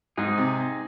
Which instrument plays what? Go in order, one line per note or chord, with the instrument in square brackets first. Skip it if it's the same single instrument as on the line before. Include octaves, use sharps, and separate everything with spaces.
[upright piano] G#2 [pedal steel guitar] C4 D#4 G#4
[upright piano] C3